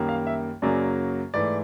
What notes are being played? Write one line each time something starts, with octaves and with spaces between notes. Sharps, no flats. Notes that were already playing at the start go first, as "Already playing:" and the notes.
Already playing: F#2 D#3 G3 A#3
F5
E5
F#2 C#3 F#3 A#3 D5
G#2 E3 A3 D5